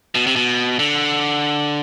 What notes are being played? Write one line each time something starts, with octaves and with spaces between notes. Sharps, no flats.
B2
C3
B2
D3